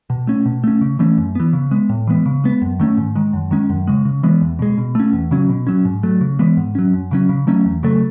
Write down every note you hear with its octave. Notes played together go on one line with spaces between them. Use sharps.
B2
A3 C#4
B2
A3 C#4
C#3
E3 A3 C#4
F#2
E3 B3
C#3
G#3 B3
A2
E3 G#3 B3
C#3
G#3 B3
F#2
D#3 A3 C#4
G#2
D#3 G#3
F#2
D#3 G#3 C#4
F#2
C#3 G#3
C#3
E3 G#3 B3
E2
B2 G#3
B2
A3 C#4
E2
C#3 F#3 C#4
B2
F#3 C#4
G#2
F#3 A3
C#3
E3 G#3 B3
G#2
F#3 C#4
F#2
C#3 F#3 C#4
C#3
F#3 A3 C#4
E2
C#3 F#3 A3